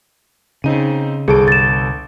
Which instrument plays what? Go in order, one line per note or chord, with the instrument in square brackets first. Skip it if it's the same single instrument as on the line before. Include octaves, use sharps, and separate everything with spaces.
[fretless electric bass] C#3 [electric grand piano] C4 D#4 D#7
[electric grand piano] G1 A4 D7 [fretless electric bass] C2 [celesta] G#4
[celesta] A6 E7